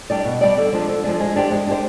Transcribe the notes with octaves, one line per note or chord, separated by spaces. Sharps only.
G3 D4 G4 D5
B2
G3 D4 G4 D5
D3
F3 G#3 D4
D3
F3 G#3 D4
G#3
D4 G4 C5
G#3
D4 G4 C5